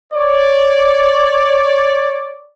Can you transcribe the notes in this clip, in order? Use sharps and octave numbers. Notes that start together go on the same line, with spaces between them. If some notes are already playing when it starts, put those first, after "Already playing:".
C#5 D5